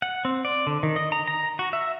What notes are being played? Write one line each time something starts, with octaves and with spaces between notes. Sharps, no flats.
F#5
C4
D5
D3
D#3
D#5
A#5
A#5
F#4
E5